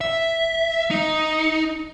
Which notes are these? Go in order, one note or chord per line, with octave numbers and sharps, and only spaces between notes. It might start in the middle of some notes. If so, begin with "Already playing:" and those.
E5
D#4